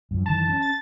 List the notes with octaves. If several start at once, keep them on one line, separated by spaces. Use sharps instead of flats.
F#2 F3
F#2 D#3 E3 A5
C#4
A6